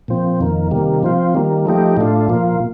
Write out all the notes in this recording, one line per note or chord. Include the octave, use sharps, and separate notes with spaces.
A#2 F3 C4
F2 D#3 A#3
C3 D#3 G3 A#3
F3 C4 F4
D#3 G3 A#3
F3 A3 D#4 G4
A2 A3 D4 F4
A#2 F3 A#3 F4